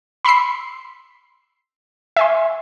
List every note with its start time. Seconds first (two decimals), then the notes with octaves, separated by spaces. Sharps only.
0.25 B5 C6 E6 B6 C7
2.16 E5 G#5 C6